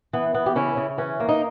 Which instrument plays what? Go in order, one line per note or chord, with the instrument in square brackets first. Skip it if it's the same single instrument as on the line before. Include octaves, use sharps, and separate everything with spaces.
[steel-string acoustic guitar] E3 B3
E3 B3
G4
C#3 C#4 E4
C#3
E3 C#4
A#3
D#4